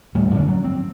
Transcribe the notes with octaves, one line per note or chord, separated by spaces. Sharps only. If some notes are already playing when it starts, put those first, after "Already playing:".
D#2 A2 G3 A3
F#2 D3 C#4 D4
F#3
C4